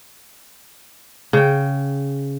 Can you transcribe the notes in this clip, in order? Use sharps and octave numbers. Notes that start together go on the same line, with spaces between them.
C#3 G5